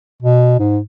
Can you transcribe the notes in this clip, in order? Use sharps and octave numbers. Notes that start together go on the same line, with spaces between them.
B2
G#2